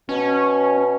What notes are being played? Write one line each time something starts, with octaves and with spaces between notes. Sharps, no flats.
B2 C#4